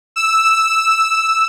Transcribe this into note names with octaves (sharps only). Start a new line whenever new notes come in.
E6